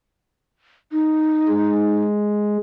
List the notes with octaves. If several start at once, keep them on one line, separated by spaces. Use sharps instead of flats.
D#4
G#3